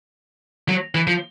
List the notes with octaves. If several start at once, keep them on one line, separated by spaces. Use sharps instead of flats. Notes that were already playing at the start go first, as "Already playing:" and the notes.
F#3
E3
F3